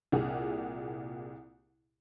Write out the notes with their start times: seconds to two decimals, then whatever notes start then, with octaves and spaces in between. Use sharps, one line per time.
0.12 C2 A#2 G4 G#4 F#5